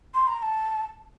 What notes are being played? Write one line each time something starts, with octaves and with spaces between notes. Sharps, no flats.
C6
A#5
A#5
A5